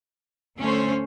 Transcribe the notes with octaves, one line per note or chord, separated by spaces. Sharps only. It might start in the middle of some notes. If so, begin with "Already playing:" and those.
D2 A3 C#4 C5